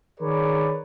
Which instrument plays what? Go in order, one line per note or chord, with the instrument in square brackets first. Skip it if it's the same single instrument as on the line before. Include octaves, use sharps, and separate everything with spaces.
[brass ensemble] D#3 G#4 A#4 B4 C#5 D5